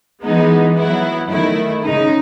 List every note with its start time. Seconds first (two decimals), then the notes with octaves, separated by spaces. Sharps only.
0.24 E3 G#3 B3 D#4
0.77 F#3 B3 E4
1.29 D#3 A3 E4
1.83 C#3 G#3 D#4